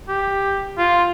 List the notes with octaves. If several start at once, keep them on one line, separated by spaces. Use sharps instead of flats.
G4
F4